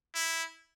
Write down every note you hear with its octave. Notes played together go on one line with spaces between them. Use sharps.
E4